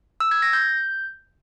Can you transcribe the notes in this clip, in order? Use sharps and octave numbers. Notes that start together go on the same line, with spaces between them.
E6
G#6
A#6
G6